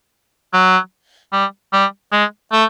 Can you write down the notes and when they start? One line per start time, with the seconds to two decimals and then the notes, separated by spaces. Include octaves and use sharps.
0.53 F#3
1.32 G3
1.73 G3
2.12 G#3
2.52 A3